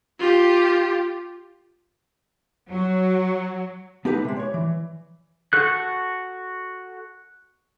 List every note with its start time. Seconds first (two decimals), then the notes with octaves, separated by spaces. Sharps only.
0.19 F4 G4
2.69 F#3
4.05 B3 D#4 G4 A4 B4 F#5
4.25 C3 G#3
4.36 C#5 D5
4.54 E3
5.53 F#4 A4 F#6